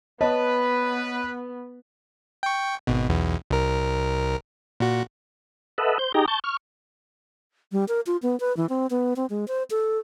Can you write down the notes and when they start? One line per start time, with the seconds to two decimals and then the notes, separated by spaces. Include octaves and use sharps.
0.21 B3 B4 C#5 D#5 A5
2.43 G5 C#6
2.87 G#1 B2
3.09 B1 E2
3.51 C2 A#4
4.80 A#2 F#4
5.78 A4 B4 D#5 E5 F#5
5.99 C5 G6
6.14 D#4 G4 G#4 G5 A#5
6.28 A5 C#6 G6
6.44 C#6 F6
7.72 G3
7.88 A#4
8.07 F4
8.22 B3
8.40 B4
8.57 E3
8.69 C4
8.90 B3
9.16 C4
9.30 G#3
9.48 C5
9.70 A4